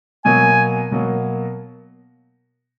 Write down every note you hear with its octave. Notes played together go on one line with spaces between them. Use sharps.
B2 F#3 A#3 G#5
B2 F#3 A#3